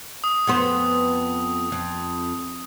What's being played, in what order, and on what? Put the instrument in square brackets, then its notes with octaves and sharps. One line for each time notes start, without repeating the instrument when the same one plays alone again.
[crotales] D#6
[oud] F2 B3 C5
F2